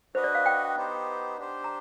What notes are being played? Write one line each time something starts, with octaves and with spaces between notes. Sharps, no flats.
D4 F#4 B4 C5 D#5
D5
F5
G5
B3 D#4 G4 C5
D4 G4 C5
A#5